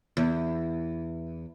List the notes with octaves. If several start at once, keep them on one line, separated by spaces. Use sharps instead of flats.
E2